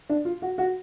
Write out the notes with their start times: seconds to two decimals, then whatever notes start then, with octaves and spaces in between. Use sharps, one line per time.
0.09 D4
0.25 F4
0.42 F#4
0.58 F#4